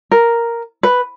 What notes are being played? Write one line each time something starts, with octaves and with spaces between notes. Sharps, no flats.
A#4
B4